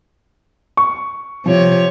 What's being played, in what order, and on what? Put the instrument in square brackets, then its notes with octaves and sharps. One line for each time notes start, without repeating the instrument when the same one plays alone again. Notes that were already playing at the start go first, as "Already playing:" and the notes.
[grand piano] C#6
[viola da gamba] C3 C#5 [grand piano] F3